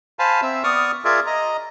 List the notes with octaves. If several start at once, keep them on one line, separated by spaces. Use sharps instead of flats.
C5 F5 G#5 A5 B5
C4 E5 E6
B3 D5 C#6 D#6 F6
F4 G#4 A#4 D5 E5
D#5 A#5